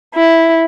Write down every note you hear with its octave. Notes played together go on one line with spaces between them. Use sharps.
E4